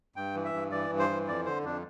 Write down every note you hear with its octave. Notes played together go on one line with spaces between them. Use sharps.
G2 G5
E3
E5
G2
E3 D5
G2
C5
E3
F2 D5
D3 C5
F2 D4